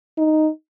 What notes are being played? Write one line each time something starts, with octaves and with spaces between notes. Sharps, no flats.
D#4